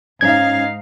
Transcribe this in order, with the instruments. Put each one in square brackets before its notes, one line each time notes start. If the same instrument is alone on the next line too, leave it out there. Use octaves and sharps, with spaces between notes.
[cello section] G#2 D#4 F5 [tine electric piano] C#4 G#6